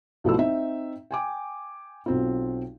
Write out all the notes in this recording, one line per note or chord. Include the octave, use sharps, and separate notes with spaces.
B1 B2 F3 A3 E4 E6
C4 D#4 E5
G5 G#5 D6
B1 C4 F4